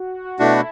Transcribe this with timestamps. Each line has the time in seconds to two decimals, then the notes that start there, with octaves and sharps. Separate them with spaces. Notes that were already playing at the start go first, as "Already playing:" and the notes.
Already playing: F#4
0.25 F#4
0.39 B2 A3 D4 E4 F#4 A4